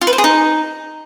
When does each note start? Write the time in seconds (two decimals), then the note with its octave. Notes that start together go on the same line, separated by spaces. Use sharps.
0.01 F4
0.07 B4
0.13 C5
0.18 G#4
0.24 D#4